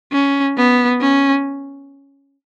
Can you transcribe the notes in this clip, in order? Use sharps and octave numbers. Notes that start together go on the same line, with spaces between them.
C#4
B3
C#4